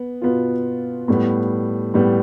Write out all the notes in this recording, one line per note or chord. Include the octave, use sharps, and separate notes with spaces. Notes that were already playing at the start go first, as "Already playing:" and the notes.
Already playing: B3
B2 B3 F4
A2 G3 B3
A2 G3 B3